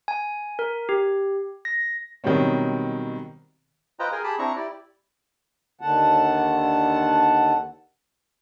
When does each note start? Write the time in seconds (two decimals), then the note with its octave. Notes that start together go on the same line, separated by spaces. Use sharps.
0.08 G#5
0.59 A#4
0.89 G4
1.65 A#6
2.24 B2 D#3 F#3 G3 C4 C#4
3.99 F4 B4 C5 D#5 G5 A#5
4.12 G#4 A#4 G5 G#5
4.24 G4 G#4 A5 B5
4.39 C4 D4 E4 A#5 C#6
4.56 E4 G4 D5
5.81 D#2 D3 D#3 F#5 A5